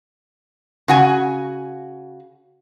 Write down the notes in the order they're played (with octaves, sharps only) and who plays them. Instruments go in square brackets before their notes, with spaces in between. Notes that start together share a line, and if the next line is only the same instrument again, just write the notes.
[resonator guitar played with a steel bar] C#3 F#4 G#5